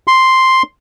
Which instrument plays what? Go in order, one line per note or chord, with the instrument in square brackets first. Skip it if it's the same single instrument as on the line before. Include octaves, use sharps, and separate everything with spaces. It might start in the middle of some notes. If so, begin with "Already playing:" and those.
[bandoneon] C6